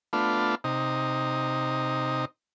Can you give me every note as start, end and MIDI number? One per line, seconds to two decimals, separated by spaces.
0.13 0.55 57
0.13 0.55 59
0.13 0.55 62
0.13 0.55 65
0.64 2.25 48
0.64 2.25 63